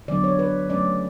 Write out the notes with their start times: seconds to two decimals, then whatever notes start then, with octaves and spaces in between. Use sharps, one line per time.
0.08 D3 F#3 B3 D4 D5
0.24 C#5
0.39 B4
0.69 F#3 A3 C#4 D5